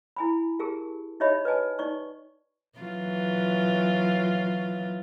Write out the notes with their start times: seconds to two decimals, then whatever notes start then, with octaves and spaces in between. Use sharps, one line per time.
0.16 E4 G#5 B5
0.59 G4 G#4 A#4 A5
1.20 D#4 G4 C#5 D#5 E5 B5
1.45 B4 D#5 G#5 A5
1.79 D#4 D5 C#6
2.79 E3 F#3 F4